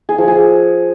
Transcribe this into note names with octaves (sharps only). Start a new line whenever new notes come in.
G#4
F3
G#4